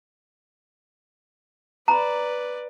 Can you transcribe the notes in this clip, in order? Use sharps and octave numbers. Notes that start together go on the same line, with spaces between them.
B4 D5 A#5 B5